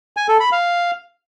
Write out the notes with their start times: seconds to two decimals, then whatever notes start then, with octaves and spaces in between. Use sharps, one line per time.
0.17 G#5
0.28 A4
0.40 B5
0.52 F5